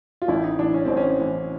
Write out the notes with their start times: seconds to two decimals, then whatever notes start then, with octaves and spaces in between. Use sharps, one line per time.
0.22 F4
0.28 A1 E4
0.44 D#4
0.59 A2 E3 D4
0.74 C#4
0.85 A1 C4
0.97 C#4
1.19 A2 E3